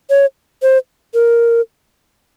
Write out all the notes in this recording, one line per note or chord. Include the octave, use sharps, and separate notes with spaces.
C#5
C5
A#4